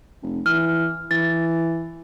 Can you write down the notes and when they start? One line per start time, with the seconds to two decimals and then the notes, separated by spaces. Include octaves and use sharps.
0.22 F1
0.46 E3 F6
1.11 E3 A6